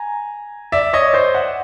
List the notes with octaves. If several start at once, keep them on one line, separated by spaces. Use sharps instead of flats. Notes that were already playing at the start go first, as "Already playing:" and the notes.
Already playing: G#5 A#5
D5 E5
C#5 D#5
C5 D5
E5 F#5